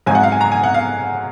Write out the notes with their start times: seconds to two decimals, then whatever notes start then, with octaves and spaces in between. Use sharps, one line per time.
0.06 G#2 F#3 C4 G#5
0.15 F#5
0.23 F5
0.32 G#5
0.41 A#5
0.52 G#5
0.63 F#5
0.74 F5